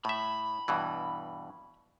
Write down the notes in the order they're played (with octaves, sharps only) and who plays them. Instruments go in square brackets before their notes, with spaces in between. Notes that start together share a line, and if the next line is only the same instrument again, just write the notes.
[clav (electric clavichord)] A2 E5 [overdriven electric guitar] B5
[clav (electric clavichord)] G2 B2 E3